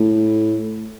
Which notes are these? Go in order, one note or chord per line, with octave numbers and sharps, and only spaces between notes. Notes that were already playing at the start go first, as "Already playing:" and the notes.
Already playing: A2